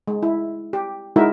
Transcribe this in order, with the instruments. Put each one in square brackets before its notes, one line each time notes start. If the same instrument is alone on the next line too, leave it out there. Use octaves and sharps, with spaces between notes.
[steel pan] G#3
E4
G4
G#3 D#4 E4 F#4 A#4 E5